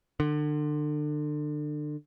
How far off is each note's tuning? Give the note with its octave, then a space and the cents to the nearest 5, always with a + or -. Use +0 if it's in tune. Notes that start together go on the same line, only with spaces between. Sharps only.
D3 +30